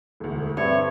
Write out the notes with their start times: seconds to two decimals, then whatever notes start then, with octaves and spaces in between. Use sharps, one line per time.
0.20 E1 D2
0.57 G2 C4 C#5 E5